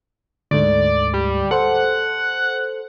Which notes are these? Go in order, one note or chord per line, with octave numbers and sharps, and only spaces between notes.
D2 G#2 A3 D5
G3
A4 C5 F#5